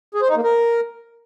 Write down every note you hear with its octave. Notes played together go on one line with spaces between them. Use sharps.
G#4
C5
D#4
A#3
A#4